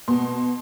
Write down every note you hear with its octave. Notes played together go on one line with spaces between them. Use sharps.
B2 C6